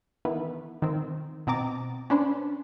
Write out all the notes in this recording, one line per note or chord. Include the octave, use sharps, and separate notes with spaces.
D#3 E3 B3
D#3 C4
B2 C4 D#5 A#5 D6 A6
C#4 D4 B4 C5